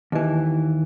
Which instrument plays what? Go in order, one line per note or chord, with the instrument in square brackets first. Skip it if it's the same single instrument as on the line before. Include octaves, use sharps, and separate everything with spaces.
[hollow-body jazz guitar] D#2 E3